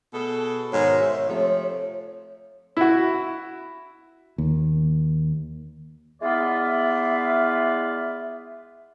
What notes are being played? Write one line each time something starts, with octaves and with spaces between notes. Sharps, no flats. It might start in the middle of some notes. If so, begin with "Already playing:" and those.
B2 G#4 A4
G#2 B2 D#3 C#5
C5 E5
C3 F3 A3
E4 F#4
D#2
G#3 B3 E4 F4 D5 E5